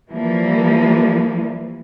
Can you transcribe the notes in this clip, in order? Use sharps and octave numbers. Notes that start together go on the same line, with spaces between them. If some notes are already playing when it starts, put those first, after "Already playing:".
E3 F3 G3 A#3